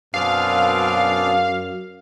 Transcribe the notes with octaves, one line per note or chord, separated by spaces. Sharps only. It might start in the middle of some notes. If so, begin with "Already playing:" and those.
F#2 B2 C4 D4 G#4 B4 D5 F5